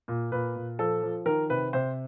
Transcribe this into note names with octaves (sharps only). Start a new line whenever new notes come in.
A#2
A#2 B4
A#2
F3 A4
F3
D#3 A#4
C3 B4
C3 C5